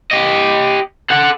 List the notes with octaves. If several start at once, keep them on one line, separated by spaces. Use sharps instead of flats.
G4 D#5
A4 F#5